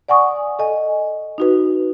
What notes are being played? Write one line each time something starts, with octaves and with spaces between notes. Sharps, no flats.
D5 F#5 G#5 C#6 D#6
A4 D#5 G#5
D#4 F#4 B4